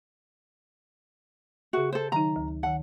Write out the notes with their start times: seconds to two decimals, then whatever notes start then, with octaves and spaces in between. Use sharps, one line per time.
1.73 C#3 F#4 G#4 E5
1.92 A4 C5
2.12 D#3 F#3 D#4 A#5
2.36 D2
2.63 D#3 F#5 A5